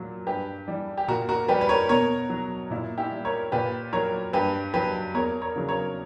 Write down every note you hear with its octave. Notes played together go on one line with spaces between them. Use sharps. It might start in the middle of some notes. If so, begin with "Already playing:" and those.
Already playing: A#2 F#3
G2 G4 B4
E3 G3
G4
A#2 F#4 A#4
F#4 A#4
G3 G4 B4
B4
A#4 C#5
B2 A#4 C#5
F#3
A#2 E4
E4 G4
G3
A#4 C#5
A#2 G4 B4
F#3 A#4 C#5
G2 G4 B4
F#3 G4 B4
E2 A#4 C#5
A#4 C#5
C#3 F#3
A#4 C#5